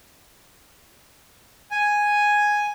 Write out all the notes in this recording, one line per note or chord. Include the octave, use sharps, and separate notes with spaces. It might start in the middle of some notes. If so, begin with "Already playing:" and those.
G#5